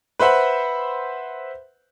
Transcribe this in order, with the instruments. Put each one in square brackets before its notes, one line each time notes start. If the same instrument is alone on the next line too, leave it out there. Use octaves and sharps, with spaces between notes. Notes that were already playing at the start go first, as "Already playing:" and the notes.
[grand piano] B4 C5 E5 F#5 B5